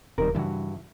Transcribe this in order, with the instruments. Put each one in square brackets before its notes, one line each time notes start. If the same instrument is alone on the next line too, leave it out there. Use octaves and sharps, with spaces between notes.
[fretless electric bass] D#1 [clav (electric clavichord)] C3 D#3 G3 [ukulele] A#4
[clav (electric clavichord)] G2 F#4 [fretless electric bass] C#3 E3 G3 [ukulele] E4